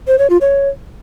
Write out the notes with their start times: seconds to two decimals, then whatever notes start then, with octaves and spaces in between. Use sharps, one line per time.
0.07 C5
0.19 C#5
0.30 F4
0.41 C#5